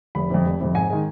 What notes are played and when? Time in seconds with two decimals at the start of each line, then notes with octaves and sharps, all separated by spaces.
0.15 F1 B5
0.30 F2 C3
0.45 F1
0.60 F2 C3
0.74 G#2 G#5
0.90 D#3 G#3